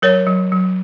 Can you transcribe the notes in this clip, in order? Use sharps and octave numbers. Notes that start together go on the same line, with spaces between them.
F#3 A#4 C#5
F#3
F#3